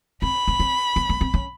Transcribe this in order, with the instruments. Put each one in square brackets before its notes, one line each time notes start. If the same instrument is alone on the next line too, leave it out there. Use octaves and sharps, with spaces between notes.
[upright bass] C4 [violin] B5
[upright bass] C4
C4
B3
A#3
C4
C#4